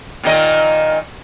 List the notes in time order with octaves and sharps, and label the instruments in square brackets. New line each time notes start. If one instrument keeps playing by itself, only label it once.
[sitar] A#2 D#3 D#5